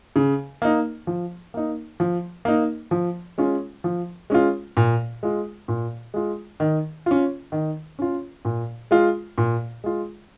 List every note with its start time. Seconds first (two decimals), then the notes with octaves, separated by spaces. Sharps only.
0.16 C#3
0.62 A#3 D#4
1.07 F3
1.54 A#3 D#4
2.00 F3
2.45 A#3 D#4
2.91 F3
3.38 G#3 C#4 F4
3.84 F3
4.30 G#3 C#4 F4
4.77 A#2
5.23 G#3 F4
5.68 A#2
6.14 G#3 F4
6.60 D#3
7.06 C#4 F4
7.52 D#3
7.99 C#4 F4
8.45 A#2
8.91 G#3 F4
9.38 A#2
9.84 G#3 F4